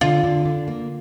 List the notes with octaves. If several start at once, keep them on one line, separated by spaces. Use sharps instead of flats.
D3 F4
D3
D3
A#3